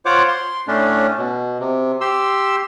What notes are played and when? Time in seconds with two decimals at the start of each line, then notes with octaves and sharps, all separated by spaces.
0.06 F4 C5 C#5 F#5 D6
0.28 C6
0.68 A2 A3 C#4 D4
1.18 B2
1.60 C3
2.01 G4 C6 E6